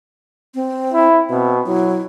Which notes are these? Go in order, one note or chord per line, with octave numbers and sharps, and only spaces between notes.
C4
E4
B2 C4
F#3 E4